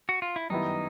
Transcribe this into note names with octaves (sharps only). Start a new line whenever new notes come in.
F#4
F4
E4
F#2 D#3 G3 B3 D#4 E4